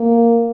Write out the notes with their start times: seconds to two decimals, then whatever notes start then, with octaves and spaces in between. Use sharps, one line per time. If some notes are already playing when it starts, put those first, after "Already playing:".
Already playing: A#3